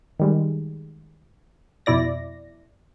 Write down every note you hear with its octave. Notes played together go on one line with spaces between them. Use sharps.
D#3 G3 G#3
F2 B2 E4 D5 A#6